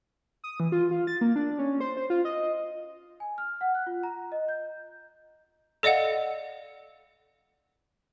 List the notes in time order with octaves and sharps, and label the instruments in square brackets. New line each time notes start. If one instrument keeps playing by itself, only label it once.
[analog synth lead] D#6
E3
F4
F4
A6
A#3
D4
C#4
C5
C5
F4
D#5
[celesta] G#5
F6
F#5
F#6
F4
A#5
D#5
G6
[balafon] A4 D5 D#5 F5 F#5